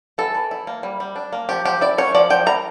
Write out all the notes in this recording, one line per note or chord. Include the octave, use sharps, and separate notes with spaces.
E3 A4
E3
E4
A#3
G3
G3
D4
A#3
F3 G4
F3 G4
E4 D5
C#4 C#5
F3 D5
F3 G5
E4 A#5